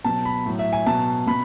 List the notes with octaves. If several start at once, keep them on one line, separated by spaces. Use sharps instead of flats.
B2 F#3 A5
B5
A2 F#3
E5
G#5
B2 F#3 A5
B2 B5